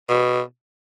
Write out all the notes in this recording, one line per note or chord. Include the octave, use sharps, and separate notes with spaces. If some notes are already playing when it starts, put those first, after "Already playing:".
B2